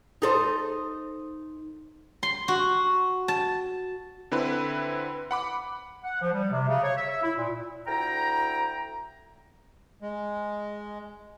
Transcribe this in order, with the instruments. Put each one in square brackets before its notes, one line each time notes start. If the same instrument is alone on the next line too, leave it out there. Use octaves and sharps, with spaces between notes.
[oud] D#4 A4 C5
[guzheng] C6
F#4
A5
[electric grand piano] D3 C4 E4 B4
F#5 B5 D6
[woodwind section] F#5
F3
G3
C3
C#3
C#5
E5
E5
E4
A#2
D2 E4 G5 A#5
[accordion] G#3